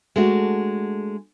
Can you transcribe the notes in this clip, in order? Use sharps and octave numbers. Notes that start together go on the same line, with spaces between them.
G#3 A3 D4 F#4